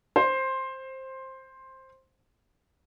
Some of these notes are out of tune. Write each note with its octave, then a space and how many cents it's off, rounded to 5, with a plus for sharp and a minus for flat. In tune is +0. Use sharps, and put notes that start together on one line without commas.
C5 +10